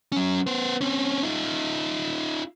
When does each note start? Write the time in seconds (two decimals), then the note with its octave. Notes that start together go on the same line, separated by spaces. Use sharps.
0.12 F#3 C#4
0.47 B3 C5
0.81 C4 C#4
1.23 D#4 F4